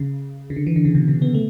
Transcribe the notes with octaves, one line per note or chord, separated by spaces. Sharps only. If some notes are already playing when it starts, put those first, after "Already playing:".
Already playing: C#3
C#3
D3
E3
D3
C#3
B2
C#3
B3
A3